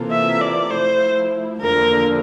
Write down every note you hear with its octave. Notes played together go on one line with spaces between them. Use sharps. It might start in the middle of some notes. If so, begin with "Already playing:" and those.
Already playing: C3 E3 A#3 F4 A4
E5
D5
F3 A3 E4 C5
E2 D3 F3 A#3 A#4